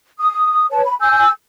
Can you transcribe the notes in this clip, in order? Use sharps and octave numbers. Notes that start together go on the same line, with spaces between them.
D#6
B4 C#5 A5
B5
G#5 E6 G6